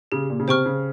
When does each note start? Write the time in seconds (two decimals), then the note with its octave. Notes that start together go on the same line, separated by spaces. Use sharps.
0.12 C#3 G4
0.30 A#2
0.39 C#3
0.48 C3 C5 G5 C#6 F6
0.65 C#3